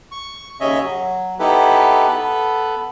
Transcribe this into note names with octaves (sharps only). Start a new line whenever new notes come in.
C#6
D#2 C#3 C#4 C#5 D#5 E5
F#3
B3 D#4 E4 G4 A4 B4
B3 A4 B4